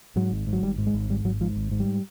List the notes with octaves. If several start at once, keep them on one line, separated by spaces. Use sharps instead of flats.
G#2 F#3
G#1
G#2
F#3
G#1 G3
G#2
G#3
G#1
G#2 G3
G#1 F#3
G#2 F3
G#1
G#2
G3